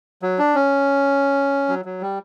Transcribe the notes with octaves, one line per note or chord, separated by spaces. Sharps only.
F#3
D4
C#4
F#3
F#3
G3